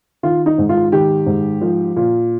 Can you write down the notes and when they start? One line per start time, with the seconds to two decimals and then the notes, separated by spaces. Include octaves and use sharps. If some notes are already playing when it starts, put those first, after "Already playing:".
0.23 D#3 F4
0.46 D#4
0.58 G#2
0.69 F4
0.92 D#3 G4
1.26 G#2
1.61 F3
1.96 A#2